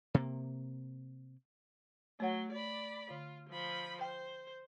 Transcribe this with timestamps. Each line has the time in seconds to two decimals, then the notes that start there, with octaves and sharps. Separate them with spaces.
0.14 C3 A#3
2.20 F#3 A3 C#5 F#5
2.52 D5 B5
3.10 D3 F4
3.49 F3 B5
4.01 C5 G5